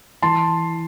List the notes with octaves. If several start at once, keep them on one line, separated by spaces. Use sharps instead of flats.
E3 A5 C6